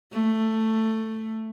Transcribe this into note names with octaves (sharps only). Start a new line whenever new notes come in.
A3